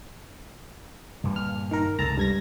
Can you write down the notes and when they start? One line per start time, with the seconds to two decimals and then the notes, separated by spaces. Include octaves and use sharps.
1.24 G2 A#2 D3
1.36 F6
1.71 D#3 A#4
1.99 C#2 C3 A4 A5 A#5
2.17 G2 G#6 A#6